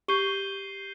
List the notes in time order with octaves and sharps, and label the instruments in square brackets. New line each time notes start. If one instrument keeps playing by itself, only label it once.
[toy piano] G4 [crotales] G6 C7 D#7 G7